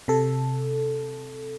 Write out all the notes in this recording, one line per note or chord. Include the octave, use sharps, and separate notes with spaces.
C3 A4